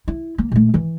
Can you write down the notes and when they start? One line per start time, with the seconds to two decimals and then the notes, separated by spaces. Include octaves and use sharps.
0.08 E4
0.38 A#3
0.52 A#2 A3
0.74 E3